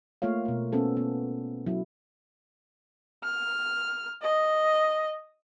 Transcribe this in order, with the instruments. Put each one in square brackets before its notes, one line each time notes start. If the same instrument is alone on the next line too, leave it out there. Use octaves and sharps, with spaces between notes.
[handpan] A3 A#3 F4 C#5 F5
B2 A#4
B3 C#4 A4 C5
B3
F#3 E4
[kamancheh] F6
D#5